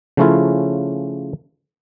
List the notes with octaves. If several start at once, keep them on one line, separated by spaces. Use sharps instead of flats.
C#3 F3 A3 C#4 E4 F4